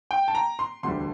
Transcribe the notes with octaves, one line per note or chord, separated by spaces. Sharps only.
G5
A5
A#5
C6
E1 D2 D3 G3 C6